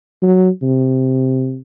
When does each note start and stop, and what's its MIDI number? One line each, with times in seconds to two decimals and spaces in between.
0.23 0.50 54
0.63 1.59 48